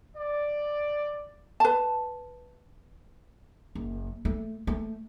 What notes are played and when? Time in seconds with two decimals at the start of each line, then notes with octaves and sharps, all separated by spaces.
0.17 D5
1.60 B4 A5
3.75 F#1
4.25 A3
4.67 A3